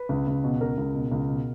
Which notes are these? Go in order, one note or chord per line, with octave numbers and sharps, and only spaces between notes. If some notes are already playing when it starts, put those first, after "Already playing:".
Already playing: B4
C#2
C#2
B2
C#2 A#4
C#2
B2
C#2
B2